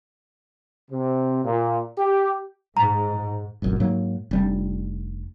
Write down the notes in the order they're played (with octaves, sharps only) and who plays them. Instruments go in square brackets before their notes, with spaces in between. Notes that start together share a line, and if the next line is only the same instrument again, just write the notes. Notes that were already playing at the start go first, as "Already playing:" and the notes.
[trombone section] C3
A#2
G4
[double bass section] G#2 [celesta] A#5
[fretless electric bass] F1 A#1 F#2
G#2 F#3 A#3
F1 G3 D4